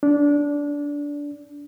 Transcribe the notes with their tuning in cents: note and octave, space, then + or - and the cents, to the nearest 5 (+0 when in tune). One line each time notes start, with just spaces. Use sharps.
D4 -20